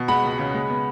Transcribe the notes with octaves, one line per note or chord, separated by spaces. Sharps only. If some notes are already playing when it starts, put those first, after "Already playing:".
Already playing: B2
G#3 F#5 B5
C#2
C#3
G#3
B3